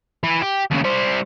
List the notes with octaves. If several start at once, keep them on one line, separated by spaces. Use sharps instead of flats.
E4 B4
G4
D#2 C#3
G3 C5